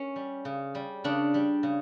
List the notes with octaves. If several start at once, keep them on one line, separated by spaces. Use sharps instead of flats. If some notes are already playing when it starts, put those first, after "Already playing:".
Already playing: C#4
G3
C#3
G3
C#3 D4
G3
C#3